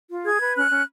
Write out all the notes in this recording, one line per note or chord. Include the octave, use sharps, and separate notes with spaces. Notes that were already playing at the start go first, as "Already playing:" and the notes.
F4
G#4 G#6
B4
C#4 F#6
C#4